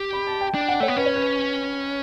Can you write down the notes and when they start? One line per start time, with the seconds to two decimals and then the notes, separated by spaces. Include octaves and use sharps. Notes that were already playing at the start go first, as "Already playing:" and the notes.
Already playing: G4
0.13 B5
0.27 A5
0.41 G5
0.54 D4
0.68 F#5
0.80 A3 C#5
0.88 B3
0.97 C#4 B4
1.06 C#5
1.16 B4